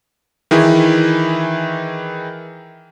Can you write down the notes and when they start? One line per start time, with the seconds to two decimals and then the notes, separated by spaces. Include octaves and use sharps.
0.51 D#3 E3 E4 G#4